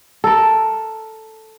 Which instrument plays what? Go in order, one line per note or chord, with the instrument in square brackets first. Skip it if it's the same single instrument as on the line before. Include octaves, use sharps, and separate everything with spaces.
[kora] A4 A#4